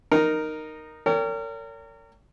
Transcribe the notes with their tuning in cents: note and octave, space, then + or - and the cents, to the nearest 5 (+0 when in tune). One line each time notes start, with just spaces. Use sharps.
D#4 -10 A#4 +0
A#4 -35 C#5 +40 G5 +15